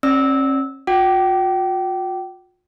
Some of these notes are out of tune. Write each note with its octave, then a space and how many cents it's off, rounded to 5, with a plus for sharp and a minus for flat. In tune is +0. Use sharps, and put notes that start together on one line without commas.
C#4 -45 D5 +0 E6 -20
F4 +45 G5 -30 D6 +0